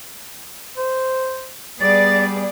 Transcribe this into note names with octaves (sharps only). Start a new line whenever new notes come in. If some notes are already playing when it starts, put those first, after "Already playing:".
C5
G3 B3 G#4 D5 A6